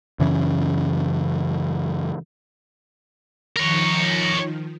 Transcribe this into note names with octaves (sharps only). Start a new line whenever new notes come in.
F#2 C#3 E3 C#4
D#3 F3 A#4 C#5